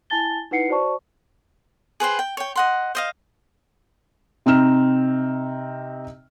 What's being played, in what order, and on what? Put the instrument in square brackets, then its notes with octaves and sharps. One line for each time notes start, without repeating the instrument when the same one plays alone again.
[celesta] E4 G#5 A5 A6 G7
D#4 E4 B4 F#5 C7 C#7
F#4 C5 D5 A5 C#6
[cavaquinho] G#4 B4 C5 G5
G5
C#5 G5
D#5 F#5 C6
C5 D#5 F5
[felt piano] C3 C4 D#4 F6 E7